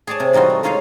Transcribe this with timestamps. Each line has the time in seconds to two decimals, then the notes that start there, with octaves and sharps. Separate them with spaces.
0.07 G#4 C#5 D5 G#5 A5
0.20 C3
0.33 E3 G3 D#4 F4 F#4
0.50 A3
0.63 G#3 D#4 F4 G#4 C#5 F5